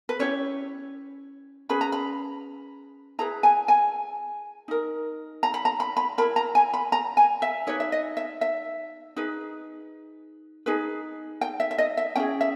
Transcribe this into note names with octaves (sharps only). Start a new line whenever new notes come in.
B4
C#4 E4 G4 C#5
C#4 G#4 B4 B5
A#5
B5
E4 G#4 B4 A#5
G#5
G#5
D#4 A#4
A#5
B5
A#5
B5
B5
E4 A#4 B5
A#5
G#5
B5
A#5
G#5
E5
D#4 G4 B4 C#5
E5
D#5
E5
E5
D#4 G#4 B4
D#4 G#4 B4
G5
E5
E5
D#5
E5
C#4 E4 G#4 G5
E5